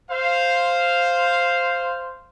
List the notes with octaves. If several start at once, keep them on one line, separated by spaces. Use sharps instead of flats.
C5 F5